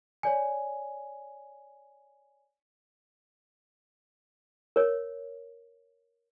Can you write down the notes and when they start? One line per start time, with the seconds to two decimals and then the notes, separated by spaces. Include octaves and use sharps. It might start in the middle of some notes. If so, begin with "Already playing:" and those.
0.23 C#5 D5 G#5
4.76 A#4 C#5